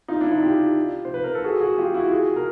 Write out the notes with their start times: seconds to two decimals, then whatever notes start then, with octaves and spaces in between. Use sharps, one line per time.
0.08 D#4 F4
0.20 D4 E4
0.32 D#4 F4
0.42 F4 G4
1.05 C5
1.14 B4
1.24 A#4
1.35 A4
1.44 F#4 G#4
1.60 F#4 G#4
1.78 F4 G4
1.94 E4 F#4
2.12 F#4 G#4
2.36 A#4